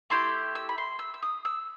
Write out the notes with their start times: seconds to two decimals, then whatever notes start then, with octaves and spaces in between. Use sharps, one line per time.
0.10 A3 E4 G4 C6
0.55 E6
0.69 B5
0.78 C6
0.99 E6
1.14 E6
1.23 D#6
1.45 E6